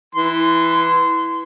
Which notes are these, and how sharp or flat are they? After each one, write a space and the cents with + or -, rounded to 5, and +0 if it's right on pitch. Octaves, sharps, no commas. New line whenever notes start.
E3 +0 C6 -25